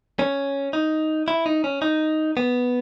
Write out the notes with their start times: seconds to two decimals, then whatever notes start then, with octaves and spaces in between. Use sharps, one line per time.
0.19 C#4
0.73 D#4
1.28 E4
1.46 D#4
1.64 C#4
1.82 D#4
2.37 B3